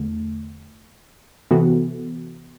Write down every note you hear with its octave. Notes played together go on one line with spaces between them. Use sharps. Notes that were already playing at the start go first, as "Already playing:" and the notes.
Already playing: E2 D3 A3
C3 E3 B3 F#4 A4